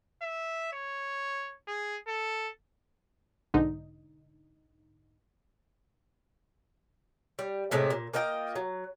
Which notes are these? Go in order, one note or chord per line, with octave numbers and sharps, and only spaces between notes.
E5
C#5
G#4
A4
B1 G#2 D3 D#4
G3
A2 C3 G#3 A3
A#2
A#3 F4 D#5 G5
F#3